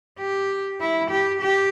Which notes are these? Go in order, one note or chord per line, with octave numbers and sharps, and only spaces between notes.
G4
E4
G4
G4